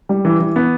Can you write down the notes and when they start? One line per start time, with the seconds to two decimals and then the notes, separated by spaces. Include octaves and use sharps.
0.09 G3
0.25 E3
0.40 E3
0.56 B3